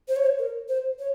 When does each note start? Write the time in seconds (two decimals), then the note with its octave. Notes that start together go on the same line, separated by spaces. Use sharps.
0.08 C5
0.16 C#5
0.26 C5
0.39 A#4
0.68 C5
0.99 C#5